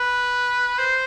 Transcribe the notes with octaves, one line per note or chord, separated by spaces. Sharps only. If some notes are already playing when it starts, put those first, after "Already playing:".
Already playing: B4
C5